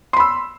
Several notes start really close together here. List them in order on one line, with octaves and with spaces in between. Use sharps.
C6 B5 E6